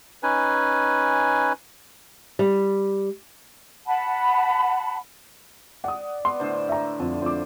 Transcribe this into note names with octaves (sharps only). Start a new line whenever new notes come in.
C#4 D#4 B4 G#5
G3
F#5 A5 B5
D5 F#5 D#6
B3 D5 C6
A2 D3 C5
E5 A#5
F2 D3
F2 C5 D6